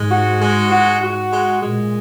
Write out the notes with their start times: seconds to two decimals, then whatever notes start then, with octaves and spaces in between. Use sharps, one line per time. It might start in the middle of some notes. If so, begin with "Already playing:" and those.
Already playing: G#2 G#3
0.09 F#4
0.40 G#3
0.71 F#4
1.01 F#4
1.31 G#3
1.62 A#2 G#3